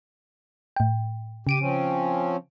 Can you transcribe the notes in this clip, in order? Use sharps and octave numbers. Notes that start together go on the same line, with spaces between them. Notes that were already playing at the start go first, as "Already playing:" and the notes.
A2 G5
C#3 G4 D7 D#7
F3 C4 C#4